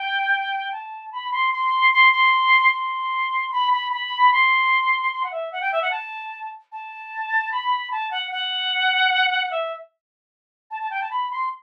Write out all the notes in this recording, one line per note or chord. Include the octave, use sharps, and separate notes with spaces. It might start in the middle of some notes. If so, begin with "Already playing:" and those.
Already playing: G5
A5
B5
C6
C6
C6
C6
C6
B5
B5
B5
C6
C6
F#5
E5
F#5
G5
E5
F#5
A5
A5
B5
A5
F#5
F#5
E5
A5
A5
G5
A5
B5
C6